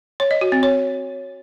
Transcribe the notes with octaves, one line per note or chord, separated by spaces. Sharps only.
C#5
D#5
F#4
C4
C#5